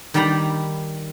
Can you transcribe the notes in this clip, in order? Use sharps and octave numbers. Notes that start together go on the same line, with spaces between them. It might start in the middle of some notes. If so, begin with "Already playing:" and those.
D#3 G3 D5 G5 A#5 B5